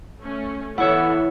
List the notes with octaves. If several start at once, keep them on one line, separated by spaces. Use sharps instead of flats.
A3 C#4
E3 B3 E4 A4 C#5 E5 F#5